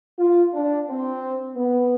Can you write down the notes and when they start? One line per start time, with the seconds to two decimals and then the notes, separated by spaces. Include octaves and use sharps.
0.18 F4
0.54 D4
0.88 C4
1.56 B3